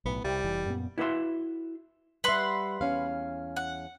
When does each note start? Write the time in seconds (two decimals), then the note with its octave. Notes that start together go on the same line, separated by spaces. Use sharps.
0.05 B1 A2 B3
0.24 C2 G3
0.44 F1 E3
0.66 F#2 A#2 B3
0.98 E4 F#4 B4 C5 E5 C6
2.24 G3 B4 E5 F#5 C6
2.81 E2 C#4 F5
3.56 F#5